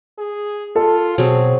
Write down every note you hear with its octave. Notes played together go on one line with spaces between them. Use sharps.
G#4
F4 A4
B2 F#3 C4 G#4